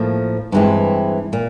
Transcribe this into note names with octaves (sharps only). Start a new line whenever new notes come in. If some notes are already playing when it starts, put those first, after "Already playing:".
Already playing: A2 F3 A#3
G2 E3 G#3 C4
A#2